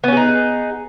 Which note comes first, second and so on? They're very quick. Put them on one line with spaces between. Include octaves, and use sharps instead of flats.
B3 C#4 G#4 D#4